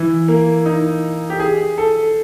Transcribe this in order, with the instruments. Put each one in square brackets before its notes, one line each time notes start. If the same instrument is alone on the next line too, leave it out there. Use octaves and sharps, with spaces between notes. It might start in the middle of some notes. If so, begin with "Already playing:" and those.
Already playing: [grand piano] E3
A#3
D#4
G4
G#4
A4